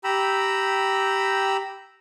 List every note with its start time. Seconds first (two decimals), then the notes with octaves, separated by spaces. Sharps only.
0.04 G4 G5 A#5 B5 E6